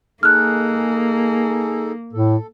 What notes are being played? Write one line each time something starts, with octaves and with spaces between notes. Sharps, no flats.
A#3 D#4 G#4 A4 F6 F#6
A2 A4